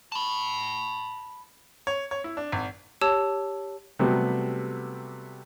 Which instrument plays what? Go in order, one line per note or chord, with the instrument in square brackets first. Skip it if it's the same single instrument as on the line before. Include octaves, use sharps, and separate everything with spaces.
[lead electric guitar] A5 B5
[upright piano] C#5
C#5
E4
D4
G#1
[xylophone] G4 C#5 A5 E6
[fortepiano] C3 F#3 G3 A3 B3